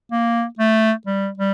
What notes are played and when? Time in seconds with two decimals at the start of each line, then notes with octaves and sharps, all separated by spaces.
0.11 A#3
0.59 A3
1.06 G3
1.38 G3